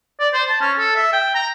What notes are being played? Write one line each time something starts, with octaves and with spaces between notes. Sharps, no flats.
D5
C5
A5
C#4
A4
E5
G5
A#5